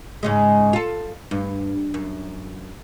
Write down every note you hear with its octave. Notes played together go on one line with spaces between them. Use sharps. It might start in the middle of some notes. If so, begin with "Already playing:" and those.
G#2 C#3 G#3
F4 A4
G2
F#2